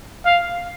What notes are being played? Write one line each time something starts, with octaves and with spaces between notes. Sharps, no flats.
F5